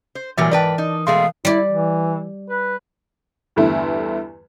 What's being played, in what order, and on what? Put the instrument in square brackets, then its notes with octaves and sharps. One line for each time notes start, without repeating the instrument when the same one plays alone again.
[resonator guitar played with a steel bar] C5
[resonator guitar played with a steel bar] A#2 F#3 G3 [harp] E3 A#4 [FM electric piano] E5 G#5
[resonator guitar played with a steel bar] G#2 B4 G5 [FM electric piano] D5 A5
[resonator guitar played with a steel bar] D#4
[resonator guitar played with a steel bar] B2 G#3 A3 [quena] F5 [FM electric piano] C6
[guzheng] G3 D5 [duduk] E4
[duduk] E3
B4
[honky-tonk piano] E2 G2 D3 E3 A3 E4